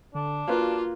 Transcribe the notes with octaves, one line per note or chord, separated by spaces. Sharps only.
D3 D4
A#3 F4 F#4 B4